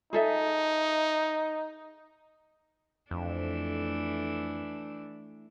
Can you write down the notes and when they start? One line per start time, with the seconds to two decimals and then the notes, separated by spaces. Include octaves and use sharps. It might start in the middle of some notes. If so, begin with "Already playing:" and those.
0.13 D#4 G#4 A4 E5
3.11 F2 E3 A3 D4